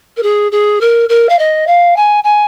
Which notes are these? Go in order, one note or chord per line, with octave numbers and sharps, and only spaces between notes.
A#4
G#4
G#4
A#4
A#4
F5
D#5
F5
G#5
G#5